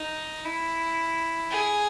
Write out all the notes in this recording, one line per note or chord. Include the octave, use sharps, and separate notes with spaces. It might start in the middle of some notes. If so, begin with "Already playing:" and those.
Already playing: D#4
E4
G#4